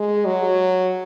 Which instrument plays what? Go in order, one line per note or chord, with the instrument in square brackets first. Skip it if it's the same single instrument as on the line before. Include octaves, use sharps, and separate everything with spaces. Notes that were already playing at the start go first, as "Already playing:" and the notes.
Already playing: [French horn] G#3
F#3